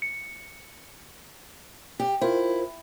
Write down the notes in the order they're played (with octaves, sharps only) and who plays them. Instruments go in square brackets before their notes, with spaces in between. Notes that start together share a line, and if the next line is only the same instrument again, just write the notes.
[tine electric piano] C#7
[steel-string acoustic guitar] G4
[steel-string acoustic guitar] E4 [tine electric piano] F4 A#4 C5